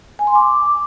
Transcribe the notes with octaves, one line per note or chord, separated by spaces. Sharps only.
G#5
C6
D6